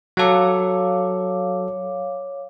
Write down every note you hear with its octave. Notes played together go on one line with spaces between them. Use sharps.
F#3 A4 C#5 F5 D6